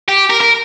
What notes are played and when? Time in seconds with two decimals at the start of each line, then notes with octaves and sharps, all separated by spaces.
0.08 G4
0.30 A#4
0.41 A#4